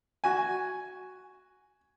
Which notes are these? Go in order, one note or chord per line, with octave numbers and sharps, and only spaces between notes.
F#4 G#5